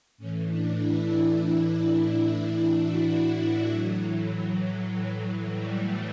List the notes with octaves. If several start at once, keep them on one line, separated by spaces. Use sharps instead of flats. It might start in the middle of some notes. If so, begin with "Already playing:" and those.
A2 E3 C#4
D4
E4
F#4
E4
A2 E3 F#3
G3
A3